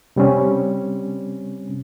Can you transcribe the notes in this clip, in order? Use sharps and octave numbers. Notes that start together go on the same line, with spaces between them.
C3 G3 C4 C#4